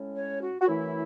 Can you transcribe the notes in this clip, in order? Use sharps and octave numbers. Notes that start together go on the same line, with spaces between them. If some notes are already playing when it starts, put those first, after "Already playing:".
Already playing: A2 G#3 C#4
C#5
F#4
F#4
F#2 E3 A3 E4